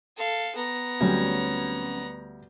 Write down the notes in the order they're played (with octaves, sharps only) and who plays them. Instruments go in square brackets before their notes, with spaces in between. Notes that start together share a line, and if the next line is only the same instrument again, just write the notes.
[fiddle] A4 F5
B3 A#5
[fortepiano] D2 G3 [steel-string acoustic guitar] F#3 C4 C#4